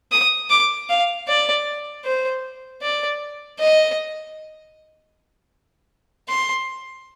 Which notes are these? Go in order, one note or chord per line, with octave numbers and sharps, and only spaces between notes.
D#6
D6
F5
D5
C5
D5
D#5
C6